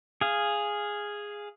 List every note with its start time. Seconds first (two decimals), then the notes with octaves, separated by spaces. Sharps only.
0.21 G#4 F5